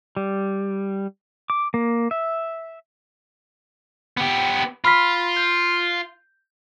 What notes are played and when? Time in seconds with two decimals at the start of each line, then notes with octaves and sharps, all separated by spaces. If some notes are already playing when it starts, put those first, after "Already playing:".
0.17 G3
1.50 D6
1.74 A#3
2.11 E5
4.17 B3 G4
4.84 F4 B5 F6 B6
5.36 G6